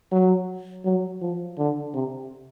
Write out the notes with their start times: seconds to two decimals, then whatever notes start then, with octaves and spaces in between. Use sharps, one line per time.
0.12 F#3
0.85 F#3
1.21 F3
1.58 D3
1.94 C3